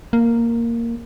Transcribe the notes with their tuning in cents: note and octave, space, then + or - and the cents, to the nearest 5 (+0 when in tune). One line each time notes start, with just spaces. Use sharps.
A#3 -5